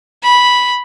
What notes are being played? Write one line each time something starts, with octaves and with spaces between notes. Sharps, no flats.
B5